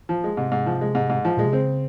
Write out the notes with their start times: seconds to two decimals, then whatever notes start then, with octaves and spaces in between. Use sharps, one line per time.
0.09 F3
0.24 G#3
0.37 G#2 C3
0.52 G#2
0.66 F3
0.81 G#3
0.95 G#2
1.10 G#2
1.25 F3
1.37 A#2 G#3
1.45 C3
1.53 C#3 C4